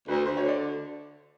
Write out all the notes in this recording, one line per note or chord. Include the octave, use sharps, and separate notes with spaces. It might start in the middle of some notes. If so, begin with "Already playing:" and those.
D2 B4
D2 C5
C#5
D3
D5